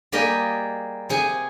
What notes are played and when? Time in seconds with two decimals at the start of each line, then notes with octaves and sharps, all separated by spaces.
0.12 G3 A#3 G4 G#4 D#5
1.09 C3 G#4 G#5